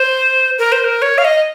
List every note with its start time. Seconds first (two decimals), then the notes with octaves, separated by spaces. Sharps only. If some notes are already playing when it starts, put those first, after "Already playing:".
Already playing: C5
0.59 A#4
0.72 C5
0.84 A#4
1.02 C#5
1.18 F5
1.24 D#5